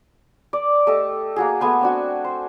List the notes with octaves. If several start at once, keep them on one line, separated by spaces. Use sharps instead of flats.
D5
A3 G4 A4 D#5
A#3 F#4 G#4
A3 B3 G#5 C6
C4 D4 F#4
C5